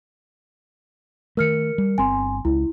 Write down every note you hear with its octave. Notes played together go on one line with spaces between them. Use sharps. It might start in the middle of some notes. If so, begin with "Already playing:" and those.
D#3 A3 A#4 F6 C#7
G3
G1 C4 G#5 C6
C#2 E4